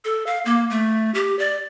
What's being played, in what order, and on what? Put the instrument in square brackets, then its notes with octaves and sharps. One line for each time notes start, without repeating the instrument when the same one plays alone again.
[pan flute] A4
F5
A#3
A3
G4
D5